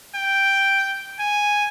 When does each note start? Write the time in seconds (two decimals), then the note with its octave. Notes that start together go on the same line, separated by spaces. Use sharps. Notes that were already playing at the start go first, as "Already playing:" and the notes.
0.15 G5
1.20 G#5